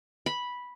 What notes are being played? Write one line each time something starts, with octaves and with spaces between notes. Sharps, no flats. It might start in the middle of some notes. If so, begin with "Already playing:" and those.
B5